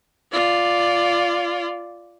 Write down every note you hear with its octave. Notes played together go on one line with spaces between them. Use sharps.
F4 D5